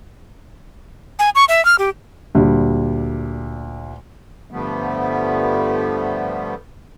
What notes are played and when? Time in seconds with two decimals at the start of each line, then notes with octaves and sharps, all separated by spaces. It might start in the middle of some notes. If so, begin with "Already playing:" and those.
1.19 G#5
1.35 C#6
1.48 E5
1.65 F6
1.79 G4
2.35 D2 A#2 G3
4.50 G2 D3 F3 G3 A3 B3